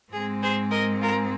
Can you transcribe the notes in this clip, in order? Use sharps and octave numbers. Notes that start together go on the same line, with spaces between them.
G#2 G#3 C4 G#4
G#4 C5
A#4 D#5
F4 A#4